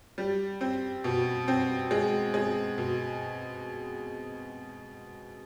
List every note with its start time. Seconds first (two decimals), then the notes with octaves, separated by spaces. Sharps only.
0.18 G3
0.61 C4
1.04 B2
1.48 C4
1.91 G#3
2.34 G#3
2.78 B2